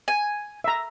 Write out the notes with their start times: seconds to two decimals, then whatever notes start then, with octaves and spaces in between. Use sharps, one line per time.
0.08 G#5
0.64 E5 A#5